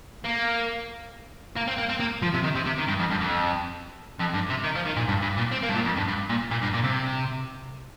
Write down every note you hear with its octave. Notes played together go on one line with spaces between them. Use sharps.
A#3
A#3
C4
A#3
C4
A#3
F3
C3
D#3
C3
C3
D#3
G2
F2
G2
F2
F2
G2
C3
D#3
F3
D#3
A#2
G2
G2
A#2
C4
A#3
G2
A#2
F2
G2
G2
A#2
A#2
G2
A#2
C3